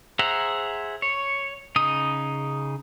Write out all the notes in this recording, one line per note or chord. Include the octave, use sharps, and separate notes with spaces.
G#4 C5 E5 F#5 A#5
C#5
C#3 D#4 D#6